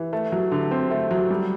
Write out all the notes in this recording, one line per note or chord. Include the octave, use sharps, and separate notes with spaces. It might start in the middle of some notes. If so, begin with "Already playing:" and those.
Already playing: E3
A3
F#3
D3
C4
A3
F#3
G3